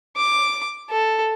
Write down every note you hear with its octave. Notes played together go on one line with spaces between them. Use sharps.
D6
A4